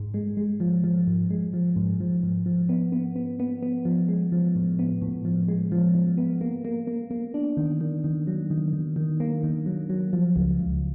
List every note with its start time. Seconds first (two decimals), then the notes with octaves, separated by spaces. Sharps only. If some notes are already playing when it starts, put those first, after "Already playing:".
Already playing: G#2 G#3
0.14 G#3
0.37 G#3
0.60 F3
0.84 F3
1.07 G#2
1.30 G#3
1.53 F3
1.76 G#2
2.00 F3
2.23 G#2
2.46 F3
2.69 B3
2.92 B3
3.16 B3
3.40 B3
3.62 B3
3.85 F3
4.09 G#3
4.32 F3
4.56 A2
4.79 B3
5.02 A2
5.25 F3
5.48 G#3
5.72 F3
5.95 F3
6.18 B3
6.41 A#3
6.65 A#3
6.87 A#3
7.11 A#3
7.34 D4
7.57 D#3
7.81 D#3
8.04 D#3
8.27 F#3
8.50 D#3
8.73 D#3
8.96 D#3
9.20 A#3
9.43 D#3
9.66 F#3
9.90 F#3
10.13 F3
10.36 C#2
10.60 C#2